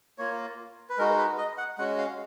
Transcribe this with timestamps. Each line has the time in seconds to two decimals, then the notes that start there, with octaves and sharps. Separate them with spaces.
0.18 A#3 F4 C#5
0.89 B4
0.98 G#3 D#4 F#4 A#4
1.18 B4
1.38 D#5
1.58 F#5
1.78 G#3 C#4 F#4 F#5
1.98 F5